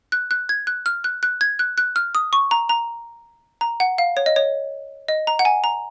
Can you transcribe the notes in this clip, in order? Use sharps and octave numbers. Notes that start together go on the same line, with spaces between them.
F#6
F#6
G#6
F#6
F6
F#6
F#6
G#6
F#6
F#6
F6
D#6
C#6
A#5
A#5
A#5
F#5
F5
C#5
D#5
C#5
D#5
A#5
F#5
G#5
A#5